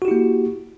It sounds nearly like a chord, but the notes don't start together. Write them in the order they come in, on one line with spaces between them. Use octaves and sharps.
F#4 G4 E4 A#3